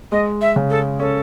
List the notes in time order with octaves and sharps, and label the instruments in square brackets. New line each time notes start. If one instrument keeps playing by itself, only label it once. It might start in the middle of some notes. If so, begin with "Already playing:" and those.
[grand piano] G#3 [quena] D#5
[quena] E5
[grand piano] C#3
[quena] A4
[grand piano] C#4 [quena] A4